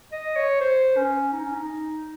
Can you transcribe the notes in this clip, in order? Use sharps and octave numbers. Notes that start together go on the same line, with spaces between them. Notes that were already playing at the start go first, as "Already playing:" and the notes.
D#5
C#5
C5
C#4
D#4
C#4
D#4